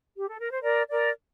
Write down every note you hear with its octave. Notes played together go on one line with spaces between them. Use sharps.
G4
A4
A#4
C5
A#4 D5
A#4 D5